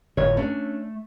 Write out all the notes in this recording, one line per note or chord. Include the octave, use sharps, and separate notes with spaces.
G1 A2 C#5
A3 C#4 D4